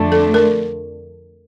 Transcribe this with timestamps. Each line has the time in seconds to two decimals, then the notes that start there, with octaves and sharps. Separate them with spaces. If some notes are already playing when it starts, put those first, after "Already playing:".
Already playing: F2 D3 A3 D4
0.12 A4
0.34 A#4